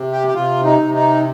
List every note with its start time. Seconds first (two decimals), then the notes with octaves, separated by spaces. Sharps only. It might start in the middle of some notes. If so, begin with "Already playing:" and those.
Already playing: C3
0.12 G4
0.27 G4
0.34 C3 F4
0.64 D#4
0.80 C3
0.94 D#4